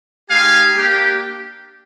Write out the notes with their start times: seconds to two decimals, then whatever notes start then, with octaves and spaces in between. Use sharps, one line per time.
0.29 G#3 D#4 G4 F5 G#5
0.76 A#3 D4 G4